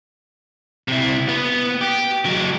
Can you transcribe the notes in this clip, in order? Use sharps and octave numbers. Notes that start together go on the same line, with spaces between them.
C3 E4
B3
G4
F#3 G#3